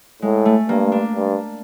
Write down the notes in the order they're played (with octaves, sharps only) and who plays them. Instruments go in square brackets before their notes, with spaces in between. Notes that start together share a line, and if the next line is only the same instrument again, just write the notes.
[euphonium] A2 [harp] G#3
[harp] A3
[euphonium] G2 [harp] A#3
[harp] D4
[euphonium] G2